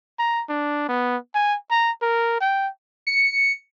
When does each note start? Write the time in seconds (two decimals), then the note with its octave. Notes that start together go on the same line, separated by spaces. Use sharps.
0.19 A#5
0.49 D4
0.89 B3
1.35 G#5
1.71 A#5
2.02 A#4
2.41 G5
3.07 C#7